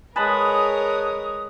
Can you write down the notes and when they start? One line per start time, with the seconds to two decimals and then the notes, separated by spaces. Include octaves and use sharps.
0.16 G#3 A#4 B4 C#5 G#5 A5 B5 D#6